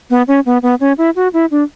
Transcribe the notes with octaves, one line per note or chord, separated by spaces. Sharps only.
B3
C#4
B3
B3
C#4
E4
F#4
E4
D4